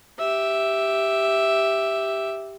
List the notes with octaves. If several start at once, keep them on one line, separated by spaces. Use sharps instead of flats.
G4 E5